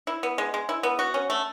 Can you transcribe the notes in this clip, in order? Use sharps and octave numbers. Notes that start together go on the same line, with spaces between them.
E4
B3
G#3
G#3
E4
B3
F#4
C#4
A3